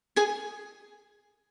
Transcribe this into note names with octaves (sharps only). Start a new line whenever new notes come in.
G#4 G#5